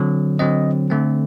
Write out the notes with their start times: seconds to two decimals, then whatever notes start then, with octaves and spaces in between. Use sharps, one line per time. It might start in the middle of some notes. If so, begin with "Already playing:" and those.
Already playing: D3 F#3 C4
0.39 D3 F#3 C4 D#5
0.90 D3 A3 C4